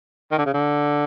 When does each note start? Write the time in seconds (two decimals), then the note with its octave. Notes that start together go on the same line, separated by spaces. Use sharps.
0.32 D#3
0.38 D3
0.46 C#3
0.54 D3